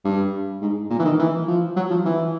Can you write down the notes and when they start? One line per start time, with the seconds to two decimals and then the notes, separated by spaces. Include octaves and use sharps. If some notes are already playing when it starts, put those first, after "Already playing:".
0.05 G2
0.61 G#2
0.90 A#2
0.99 E3
1.05 D#3
1.19 E3
1.48 F3
1.76 F#3
1.91 F3
2.05 E3